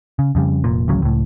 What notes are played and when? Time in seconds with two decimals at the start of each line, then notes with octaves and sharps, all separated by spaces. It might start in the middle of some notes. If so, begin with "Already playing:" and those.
0.19 C#3
0.35 F2 C#3 G3
0.64 F1 A#2
0.88 A1 D2 C#3 F#3
1.02 C#2 A2